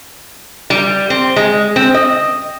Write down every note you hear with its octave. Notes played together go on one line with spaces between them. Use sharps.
G3
C4
G#3
C4
D#5